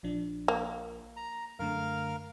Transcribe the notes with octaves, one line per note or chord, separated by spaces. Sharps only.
A#1 F3 D4
A#3
A#5
F#2 D3 A3 A#4 F5 F6